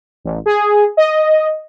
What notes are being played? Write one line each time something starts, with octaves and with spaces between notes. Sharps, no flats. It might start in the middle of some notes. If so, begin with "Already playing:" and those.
A1
G#4
D#5